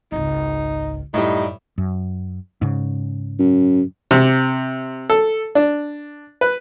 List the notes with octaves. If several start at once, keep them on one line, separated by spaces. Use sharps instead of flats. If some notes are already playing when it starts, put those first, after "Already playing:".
G#1 C#2 D#4
F#2 A2 G3 D#4
F#2
G#2 C#3
F#2
C3
A4
D4
B4